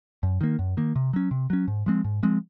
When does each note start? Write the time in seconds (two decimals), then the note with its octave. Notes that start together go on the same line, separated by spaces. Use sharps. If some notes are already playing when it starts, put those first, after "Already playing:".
0.23 F#2
0.41 D#3 A#3
0.59 F#2
0.77 D#3 A#3
0.96 C3
1.13 F#3 C#4
1.31 C3
1.50 F#3 C#4
1.68 G#2
1.86 F3 G#3 C4
2.04 G#2
2.23 F3 G#3 C4